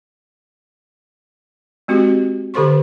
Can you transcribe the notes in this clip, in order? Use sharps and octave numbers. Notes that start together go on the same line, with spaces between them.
G#3 C4 F#4 G4
D3 G4 A4 C5 C6 C#6